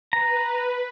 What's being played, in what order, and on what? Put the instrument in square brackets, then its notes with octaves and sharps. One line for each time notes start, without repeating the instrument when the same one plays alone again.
[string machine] B4 [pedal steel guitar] A#5